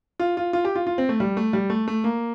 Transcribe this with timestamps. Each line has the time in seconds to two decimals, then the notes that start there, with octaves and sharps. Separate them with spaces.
0.20 F4
0.37 F4
0.53 F4
0.65 G4
0.76 F4
0.87 F4
0.98 C4
1.09 A3
1.20 G3
1.37 A3
1.53 G3
1.70 A3
1.88 A3
2.04 A#3